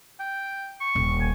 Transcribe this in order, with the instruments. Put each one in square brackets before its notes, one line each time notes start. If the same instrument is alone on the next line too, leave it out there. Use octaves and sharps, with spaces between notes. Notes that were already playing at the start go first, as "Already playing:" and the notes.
[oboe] G5
C#6
[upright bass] D#1
[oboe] G#5